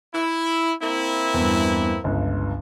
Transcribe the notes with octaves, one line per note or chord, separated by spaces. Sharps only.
E4
A#3 C4 E4
E2 G2
G1 C#2